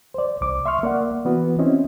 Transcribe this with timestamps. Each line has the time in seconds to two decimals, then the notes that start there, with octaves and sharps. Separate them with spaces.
0.14 C5 D5
0.41 C2 D6
0.66 E5 C6 C#6 F6
0.83 A#3 D5 F#5
1.25 E3 B3 F#4
1.59 C4 C#4 E4 D#5